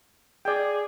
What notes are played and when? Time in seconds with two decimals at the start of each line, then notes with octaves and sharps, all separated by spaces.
0.45 G#4 D5 G5